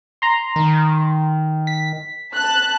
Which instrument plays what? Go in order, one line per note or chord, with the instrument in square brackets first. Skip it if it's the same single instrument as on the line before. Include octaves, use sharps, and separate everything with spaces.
[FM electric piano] A#5 C6
[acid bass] D#3
[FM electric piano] B6
[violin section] A5 F#6